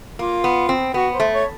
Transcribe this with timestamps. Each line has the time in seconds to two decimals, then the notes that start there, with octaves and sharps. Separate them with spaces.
0.19 A#3 F4
0.44 B3
0.69 C4
0.94 B3 F#4
1.14 C5
1.20 A3
1.32 C#5